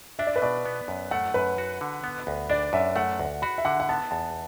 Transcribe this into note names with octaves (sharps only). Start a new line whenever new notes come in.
D4 E5
D5
B4
B2 D5
B3
F#2
A3 F#5
F#2 B4
F#4
D3
B3
D2
D4 D5
F#2 E5
A3 F#5
D2
F#4 B5
E5
D3 F#5
F#5
B3 A5
E2 A5